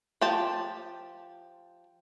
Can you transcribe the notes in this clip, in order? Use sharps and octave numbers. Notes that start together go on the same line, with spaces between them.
F3 G4 A5